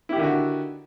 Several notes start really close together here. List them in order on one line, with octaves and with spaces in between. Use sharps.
E4 G4 D#3 D3 F#4